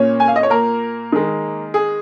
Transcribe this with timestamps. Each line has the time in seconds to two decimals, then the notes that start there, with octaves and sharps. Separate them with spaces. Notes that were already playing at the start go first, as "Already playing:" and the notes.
Already playing: A#2 A#3 C#4 C#5
0.20 G#5
0.28 F5
0.36 D#5
0.43 C#5
0.50 A#3 A#4
1.12 D#3 G#3
1.74 G#4